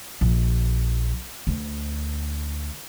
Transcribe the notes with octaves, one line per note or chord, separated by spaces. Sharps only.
A#1
D2